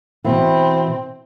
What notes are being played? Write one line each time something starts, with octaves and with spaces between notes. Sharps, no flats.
B2 E3 C4